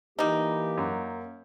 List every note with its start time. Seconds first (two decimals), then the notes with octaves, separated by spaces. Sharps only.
0.19 E3 G3 A#3 D#4 E4 G4
0.78 F#2